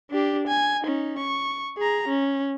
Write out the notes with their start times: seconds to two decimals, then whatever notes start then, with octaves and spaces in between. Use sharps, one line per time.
0.10 D4 G4
0.48 G#5
0.82 C#4 D#4
1.18 C#6
1.78 G#4 A#5
2.08 C#4